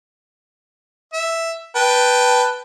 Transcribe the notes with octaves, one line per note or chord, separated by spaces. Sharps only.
E5
B4 G5 A5